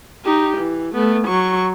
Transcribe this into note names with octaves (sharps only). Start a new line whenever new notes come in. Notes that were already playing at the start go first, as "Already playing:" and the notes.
D#4 G4
E3
A3 B3
F#3 C#6